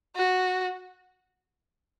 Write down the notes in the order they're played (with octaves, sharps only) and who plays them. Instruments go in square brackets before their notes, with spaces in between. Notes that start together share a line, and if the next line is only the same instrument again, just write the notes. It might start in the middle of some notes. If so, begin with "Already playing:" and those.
[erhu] F#4